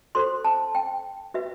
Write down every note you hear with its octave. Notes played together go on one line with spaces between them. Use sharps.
F#4 A4 C5 C6
A5
G5
F#4 B4 E5